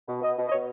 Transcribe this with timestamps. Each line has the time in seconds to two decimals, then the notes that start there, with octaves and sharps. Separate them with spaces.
0.08 B2
0.22 B2 D#5
0.37 B2
0.47 D#5
0.51 B2 C#5